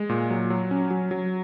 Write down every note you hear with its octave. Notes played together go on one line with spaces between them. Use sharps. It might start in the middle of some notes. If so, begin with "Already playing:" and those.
Already playing: G#3
A#2
F#3
F#3
C#4
F#3
F#3